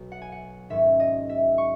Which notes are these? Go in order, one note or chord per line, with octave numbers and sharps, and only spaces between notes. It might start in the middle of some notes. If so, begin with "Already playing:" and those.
Already playing: B1 B2
F#5
G#5
F#5
G#1 G#2 F#3 C#4 E5
D#5
E5
C#6